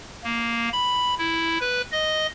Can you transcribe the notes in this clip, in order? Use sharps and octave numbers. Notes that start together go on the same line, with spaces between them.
A#3
B5
E4
B4
D#5